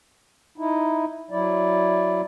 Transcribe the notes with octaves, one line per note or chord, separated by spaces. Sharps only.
D#4 E4
F#3 E4 D5